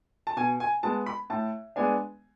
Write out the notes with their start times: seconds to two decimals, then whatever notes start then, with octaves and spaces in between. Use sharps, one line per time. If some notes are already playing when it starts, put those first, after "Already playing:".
0.27 A5
0.37 B2 G#5
0.60 G#5
0.83 G#3 B3 A5
1.06 B5
1.30 A2 A5
1.76 G#3 B3 D4 G#5